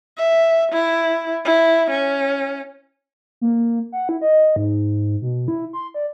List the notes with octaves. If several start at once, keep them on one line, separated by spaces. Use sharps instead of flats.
E5
E4
E4
C#4
A#3
F#5
E4
D#5
G#2
B2
E4
C6
D5